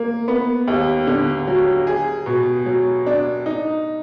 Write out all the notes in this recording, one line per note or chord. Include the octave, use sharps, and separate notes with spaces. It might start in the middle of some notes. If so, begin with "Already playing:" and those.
Already playing: A#3
B3
D#2
D3
F#3
G#4
B2
F#3
D4
D#4